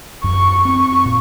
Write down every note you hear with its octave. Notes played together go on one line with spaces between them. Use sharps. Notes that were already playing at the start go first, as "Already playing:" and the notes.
F#2 C#6
C4 C#6
A#2